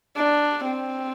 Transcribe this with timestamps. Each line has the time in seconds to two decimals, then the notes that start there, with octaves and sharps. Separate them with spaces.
0.16 D4
0.65 C4